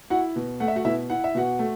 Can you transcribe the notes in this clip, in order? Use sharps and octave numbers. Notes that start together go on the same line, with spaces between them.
E4 F#4 F#5
B2
A3 F#5
E5
F#4 F#5
B2 E4 E5
E4 F#5
E5
B2 F#4 F#5
A3